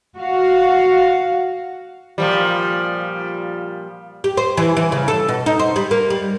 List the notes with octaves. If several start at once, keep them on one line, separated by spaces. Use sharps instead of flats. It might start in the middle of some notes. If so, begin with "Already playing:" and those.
F#4 F5
A#2 F3 G3
G4
C5
E3
E3
C#3
A4
B2
D#4
C5
G3
A#3
G3